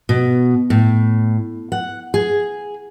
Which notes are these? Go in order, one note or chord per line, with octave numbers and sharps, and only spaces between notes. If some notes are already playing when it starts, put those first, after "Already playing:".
B2
A2
F#5
G#4